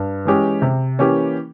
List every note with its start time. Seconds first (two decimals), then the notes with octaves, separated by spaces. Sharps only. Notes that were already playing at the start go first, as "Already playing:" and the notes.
Already playing: G2
0.25 E3 G#3 C#4 G4
0.62 C3
0.99 E3 A#3 C#4 G4